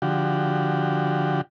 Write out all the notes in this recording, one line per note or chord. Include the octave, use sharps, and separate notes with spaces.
D3 F3 F#4 G4